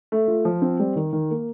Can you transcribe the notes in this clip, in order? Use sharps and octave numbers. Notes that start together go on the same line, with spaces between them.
A3
F4
F3
C4
G3
D#3
D#3
A#3